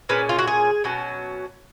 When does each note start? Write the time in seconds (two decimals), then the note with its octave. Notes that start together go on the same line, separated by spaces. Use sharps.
0.09 A#2 G#3 C#4 B4
0.29 F4
0.39 F#4
0.48 G#4
0.84 B2 F#3 C#4